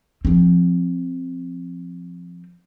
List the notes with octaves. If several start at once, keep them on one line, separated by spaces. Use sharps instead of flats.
F3 C4